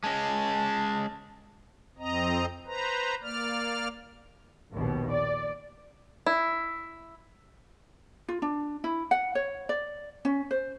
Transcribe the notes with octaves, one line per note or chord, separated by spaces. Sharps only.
G#3 C#4 A5
F2 C4 D#5 A#5
B4 C5 A#5
A#3 D5 F6
A#1 D#2 B2
D5
E4
F4
D4
E4
F#5
C#5
D5
C#4
C5